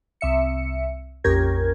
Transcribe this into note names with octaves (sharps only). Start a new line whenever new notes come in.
C2 E5 C#7
A#1 F2 C#4 G4 A#4 G#6